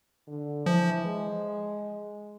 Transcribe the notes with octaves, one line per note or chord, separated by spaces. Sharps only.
D3
E3 F3
G#3